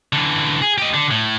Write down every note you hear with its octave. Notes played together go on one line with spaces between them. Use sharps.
D3 E3
G#4
G4 D#5
D3
A2